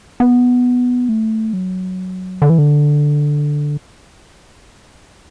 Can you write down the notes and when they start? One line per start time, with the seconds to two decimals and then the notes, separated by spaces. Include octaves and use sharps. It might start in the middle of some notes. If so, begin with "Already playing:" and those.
0.20 B3
1.09 A3
1.53 F#3
2.42 D3
2.50 E3
2.58 D3